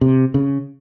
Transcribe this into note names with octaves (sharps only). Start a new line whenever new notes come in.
C3
C#3